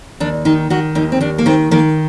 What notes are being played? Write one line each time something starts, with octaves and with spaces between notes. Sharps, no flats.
D#2 D4
D#3 D#4
D#3 F#4
D#2 D#4
C4
D#2 D4
A#3
D#3 C4
D#3 A#3